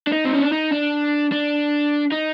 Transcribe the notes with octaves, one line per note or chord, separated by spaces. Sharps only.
D4
D#4
C4
C#4
D4
D#4
D4
D4
D#4